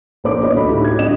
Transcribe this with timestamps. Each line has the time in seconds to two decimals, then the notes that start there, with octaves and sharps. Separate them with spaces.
0.24 A#1 A#3 C5 D6
0.42 B3 F#4 C#5 D#5
0.54 D2 A3 B5
0.68 A2 D#4 F#4 G4
0.84 G#6
0.98 G2 C4 F#4 D#5 E7